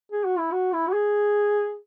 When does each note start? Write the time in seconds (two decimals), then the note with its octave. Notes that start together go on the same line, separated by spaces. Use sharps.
0.12 G#4
0.25 F#4
0.38 E4
0.52 F#4
0.73 E4
0.88 F#4
0.93 G#4